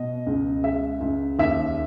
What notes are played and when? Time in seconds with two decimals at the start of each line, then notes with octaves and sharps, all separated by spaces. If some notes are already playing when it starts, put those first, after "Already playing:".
Already playing: B2 D#5
0.27 C#2
0.64 G#3 E5
1.01 C#2
1.39 D#2 E5